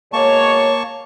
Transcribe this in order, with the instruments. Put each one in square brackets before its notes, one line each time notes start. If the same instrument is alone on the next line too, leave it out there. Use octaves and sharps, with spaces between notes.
[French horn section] B2 G#3 C#5 [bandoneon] A#3 A5 C#6